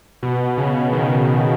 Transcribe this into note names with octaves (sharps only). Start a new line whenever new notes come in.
B2
C#3
D#3